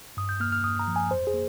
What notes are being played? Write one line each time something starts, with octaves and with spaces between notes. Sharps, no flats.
G2 D#6
G6
A#3 F6
F6
G2 D#6
A#5
F3
G#5
F2 C5
G#4
A#3